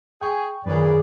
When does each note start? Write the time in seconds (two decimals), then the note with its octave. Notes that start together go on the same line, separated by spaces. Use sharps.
0.21 G#4 G5 C#6
0.66 F#2 A#2 D#3 G#4 A#4 B4 C#5 D5